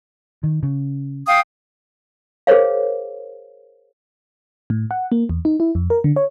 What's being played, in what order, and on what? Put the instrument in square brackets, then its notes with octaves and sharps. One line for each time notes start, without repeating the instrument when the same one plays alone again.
[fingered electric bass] D#3
C#3
[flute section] F5 G5 D#6
[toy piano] G#4 A#4 C5 C#5 F5
[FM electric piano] A2
F#5
A#3
E2
D#4
E4
F2
A#4
D3
C#5